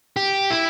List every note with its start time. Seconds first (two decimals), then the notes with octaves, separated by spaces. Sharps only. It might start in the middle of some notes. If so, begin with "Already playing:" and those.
0.17 G4
0.50 E4